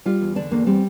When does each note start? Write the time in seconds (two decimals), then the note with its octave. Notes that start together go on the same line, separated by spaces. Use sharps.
0.06 G3 F4
0.21 E2
0.36 D3 D4
0.51 E2 A#3
0.66 G3 C4